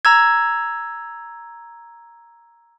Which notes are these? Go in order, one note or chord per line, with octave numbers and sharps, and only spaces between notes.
A#5 E6 G#6